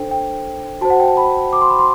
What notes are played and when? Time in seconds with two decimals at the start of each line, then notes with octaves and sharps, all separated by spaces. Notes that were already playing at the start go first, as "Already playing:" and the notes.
Already playing: D4 A4 C5 G5
0.11 G5
0.81 F#4 C5 A5
0.90 F#5
1.00 G5
1.08 A5
1.17 B5
1.53 D6
1.61 C6
1.70 B5
1.79 C6